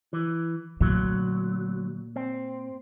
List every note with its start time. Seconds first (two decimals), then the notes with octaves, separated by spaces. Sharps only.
0.13 E3
0.80 D2 A#2 F#3
2.16 C4